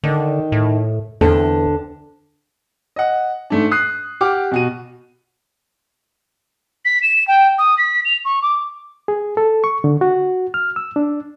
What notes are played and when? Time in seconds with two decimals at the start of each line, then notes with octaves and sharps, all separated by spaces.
0.04 D3 D#3
0.52 A2
1.21 E2 D3 C4 A4
2.96 D#5 F#5
3.50 G#2 A3 D4
3.71 D#6 F#6 C7
4.21 G4 F#5 D6 F6
4.52 B2 F#4 D#7
6.85 B6
7.02 E7
7.27 G5
7.58 D#6
7.78 B6
8.05 F7
8.25 C#6
8.42 D6
9.08 G#4
9.37 A4
9.64 C#6
9.84 D3
10.01 F#4
10.54 F6
10.76 E6
10.96 D4